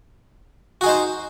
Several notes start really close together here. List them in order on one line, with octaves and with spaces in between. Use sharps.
F#4 G#4 D#4 C5